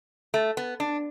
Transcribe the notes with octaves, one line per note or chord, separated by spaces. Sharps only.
A3
B3
D4